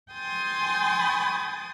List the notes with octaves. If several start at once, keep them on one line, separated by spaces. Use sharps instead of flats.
G5 G#5 C6 D#6 A6